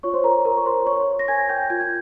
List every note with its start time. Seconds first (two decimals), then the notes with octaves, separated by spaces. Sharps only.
0.03 F4 C#5 C#6
0.14 C5 C6
0.24 A#4 C#5 A#5
0.45 A#4 A#5
0.57 C#6
0.66 F4 C5 C6
0.86 A#4 C#5 C#6
1.07 A#4
1.19 A#6
1.28 A#4 G#5 G#6
1.49 A#4 G5 G6
1.70 F4 G#6
1.81 G6